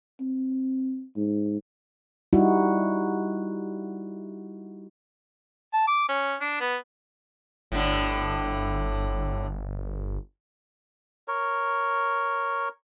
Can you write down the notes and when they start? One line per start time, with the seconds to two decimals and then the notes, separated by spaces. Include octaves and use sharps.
0.20 C4
1.16 G#2
2.33 G3 D#4 E4 F#4
5.73 A5
5.87 D6
6.09 C#4
6.41 D4
6.60 B3
7.72 G1 A2 D3
11.28 A#4 C#5